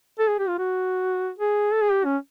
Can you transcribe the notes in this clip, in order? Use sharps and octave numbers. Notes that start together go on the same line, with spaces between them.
A4
G#4
G4
F4
F#4
G#4
A4
G#4
G4
C#4